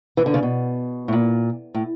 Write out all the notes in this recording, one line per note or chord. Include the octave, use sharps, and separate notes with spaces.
E3
D3
C#3
B2
A2
A#2
A2